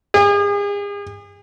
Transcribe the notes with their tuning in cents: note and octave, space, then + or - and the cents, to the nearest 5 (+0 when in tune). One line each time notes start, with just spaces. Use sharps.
G#4 -40